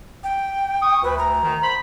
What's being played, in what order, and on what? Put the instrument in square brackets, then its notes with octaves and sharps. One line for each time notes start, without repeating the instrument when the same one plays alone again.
[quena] G5
[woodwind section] C#6 D#6
[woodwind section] D2 [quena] B4
[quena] A#5
[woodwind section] D#3
C5 B5